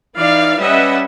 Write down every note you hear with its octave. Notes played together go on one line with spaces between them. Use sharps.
E3 D#4 D5 F5
G3 C#4 B4 D#5 E5 F#5